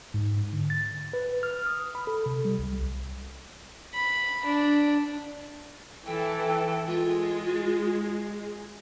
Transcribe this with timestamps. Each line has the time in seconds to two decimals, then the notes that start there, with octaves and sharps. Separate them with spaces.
0.14 G#2
0.53 D3
0.70 A6
1.13 B4
1.43 F6
1.67 D#6
1.95 B5
2.07 A4
2.26 C3
2.45 G3
2.59 C2
3.94 B5
4.45 D4
6.06 E3 A4 G5
6.87 G#3 F4